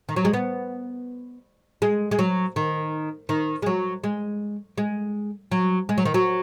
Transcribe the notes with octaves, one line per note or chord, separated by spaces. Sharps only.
D#3
F#3
G#3
B3
G#3
G#3
F#3
D#3
D#3
G#3
F#3
G#3
G#3
F#3
G#3
F#3
D#3
F#3